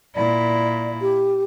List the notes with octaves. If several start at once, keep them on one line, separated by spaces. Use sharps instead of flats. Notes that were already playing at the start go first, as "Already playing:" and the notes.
A#2 E4 D5
G4